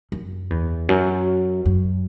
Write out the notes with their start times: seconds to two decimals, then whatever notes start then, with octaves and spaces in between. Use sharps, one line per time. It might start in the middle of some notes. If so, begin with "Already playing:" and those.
0.12 F#2
0.50 E2
0.89 F#2
1.66 F#2